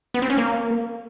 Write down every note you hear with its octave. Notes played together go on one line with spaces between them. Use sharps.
B3
C4
C#4
A#3